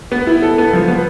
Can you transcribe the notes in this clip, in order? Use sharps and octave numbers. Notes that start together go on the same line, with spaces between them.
B3
E4
A4
B3
F3
B3